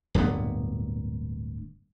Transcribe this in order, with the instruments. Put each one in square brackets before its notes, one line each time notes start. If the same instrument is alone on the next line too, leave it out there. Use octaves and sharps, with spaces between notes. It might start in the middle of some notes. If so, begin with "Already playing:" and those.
[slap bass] D1 G2 A#2 B3